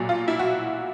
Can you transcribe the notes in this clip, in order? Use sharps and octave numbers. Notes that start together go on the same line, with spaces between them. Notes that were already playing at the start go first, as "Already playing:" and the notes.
Already playing: B1 A#2 F#3
F4
E4
F#4